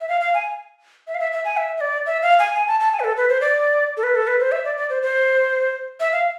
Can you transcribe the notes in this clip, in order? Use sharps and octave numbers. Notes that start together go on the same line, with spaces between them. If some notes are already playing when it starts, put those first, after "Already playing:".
E5
F5
F5
G#5
E5
F5
E5
E5
G#5
E5
E5
D5
E5
F5
G#5
G#5
A5
A5
G#5
B4
A4
B4
C5
D5
A4
B4
A4
B4
C5
E5
D5
D5
C5
C5
E5
F5